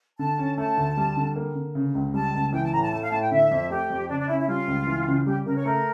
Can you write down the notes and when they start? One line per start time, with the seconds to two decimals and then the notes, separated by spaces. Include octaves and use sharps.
0.18 D3 A5
0.38 C#4
0.58 A3 A5
0.77 D2
0.97 G3
1.17 D3
1.36 A#3
1.55 D3
1.75 C#3
1.95 C#2
2.14 G3 A5
2.34 C#2
2.53 E3 G5
2.64 A5
2.72 A2 A#5
2.82 A5
2.92 A3 A5
3.03 F5
3.12 A2 A5
3.22 G5
3.31 D3 E5
3.51 F2
3.70 A3 G4
3.90 F2
4.09 C#3 D4
4.20 D4
4.28 C#4 E4
4.39 E4
4.48 G3 F4
4.67 C#2
4.87 E3
5.08 C#3
5.26 G3 G4
5.46 C#3 A#4
5.56 C#5
5.65 A3 A#4